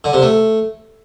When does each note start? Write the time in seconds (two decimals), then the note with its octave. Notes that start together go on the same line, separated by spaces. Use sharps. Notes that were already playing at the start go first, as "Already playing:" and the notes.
0.04 D3
0.13 C3
0.22 A3